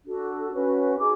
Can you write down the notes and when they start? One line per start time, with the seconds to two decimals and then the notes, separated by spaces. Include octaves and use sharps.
0.05 D4 F#4 A4
0.53 C#4 F#4 B4
0.99 D#4 G#4 D6